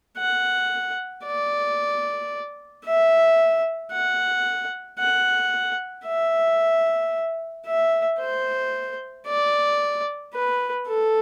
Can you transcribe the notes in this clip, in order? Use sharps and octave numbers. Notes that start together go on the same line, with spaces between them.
F#5
D5
E5
F#5
F#5
E5
E5
C5
D5
B4
A4